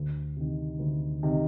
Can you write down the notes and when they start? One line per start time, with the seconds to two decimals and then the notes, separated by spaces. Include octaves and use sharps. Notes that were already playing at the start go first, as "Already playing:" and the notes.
Already playing: D2
0.37 C3 D#3
0.79 D2
1.23 C3 D#3